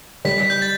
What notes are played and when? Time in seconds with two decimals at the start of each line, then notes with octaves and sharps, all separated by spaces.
0.25 G3 B6
0.50 G6
0.62 A6